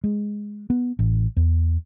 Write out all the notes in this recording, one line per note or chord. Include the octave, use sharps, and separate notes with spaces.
G#3
B3
A1
E2